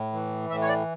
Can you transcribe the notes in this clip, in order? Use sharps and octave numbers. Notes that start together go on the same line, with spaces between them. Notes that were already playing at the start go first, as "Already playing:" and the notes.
Already playing: A2
E3
A2 E5
C#5
D5